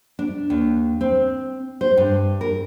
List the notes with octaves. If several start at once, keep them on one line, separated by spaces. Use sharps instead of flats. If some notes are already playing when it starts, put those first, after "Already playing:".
D4
D#2
C4
C5
G2
A#4